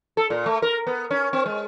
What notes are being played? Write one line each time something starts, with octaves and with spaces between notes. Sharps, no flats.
A4
A#2
A3
A#4
B3
C#4
C4
G#3